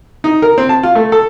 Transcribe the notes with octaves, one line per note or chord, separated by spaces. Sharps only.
D#4
A#4
C4
A5
F4
A3
A4